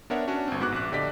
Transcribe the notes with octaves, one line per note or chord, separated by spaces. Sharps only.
B3 D4 A#4 C#5 E5 F#5
C#4 D4 F#4
G1 C4
G#2 B3 F#4 D6 F#6
A#1 F#6
A#1 D3 G4 D5 D#5 B6